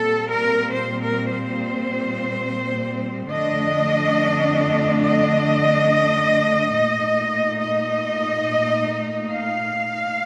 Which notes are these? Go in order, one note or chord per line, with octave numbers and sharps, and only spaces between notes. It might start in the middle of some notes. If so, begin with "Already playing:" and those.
Already playing: A#2 G3 C4 A4
A#4
C5
A#4
C5
F2 D3 A3 D4 D#5
D#5
A#2 A3 D#4
D#5
F5